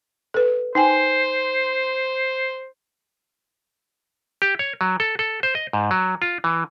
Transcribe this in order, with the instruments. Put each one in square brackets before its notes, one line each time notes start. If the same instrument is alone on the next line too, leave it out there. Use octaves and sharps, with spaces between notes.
[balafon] A4 B4
[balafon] D#4 G5 G#5 [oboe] C5
[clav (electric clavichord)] G4
C#5
F#3
A4
A4
C5
D#5
G#2
F#3
F4
E3